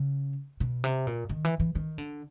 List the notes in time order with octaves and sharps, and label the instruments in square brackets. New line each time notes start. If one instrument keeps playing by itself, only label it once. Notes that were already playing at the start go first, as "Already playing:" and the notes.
Already playing: [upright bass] C#3
B2
C3
A#2
D#3
E3
E3
D#3
D3